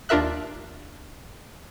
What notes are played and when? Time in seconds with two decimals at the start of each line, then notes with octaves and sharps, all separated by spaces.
0.09 D#2 D4 F4 A#4 E5 F#6